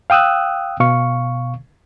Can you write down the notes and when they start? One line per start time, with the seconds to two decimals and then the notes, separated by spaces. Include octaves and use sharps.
0.10 F5 G5 D#6 E6 F#6
0.80 B2 F5 C#6